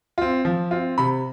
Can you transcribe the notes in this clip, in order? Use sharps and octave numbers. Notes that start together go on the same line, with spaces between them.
C4 F4
F3
C4 F4
C3 B5